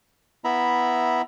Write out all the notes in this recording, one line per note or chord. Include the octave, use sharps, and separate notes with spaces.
B3 E4 E5 A#5 B5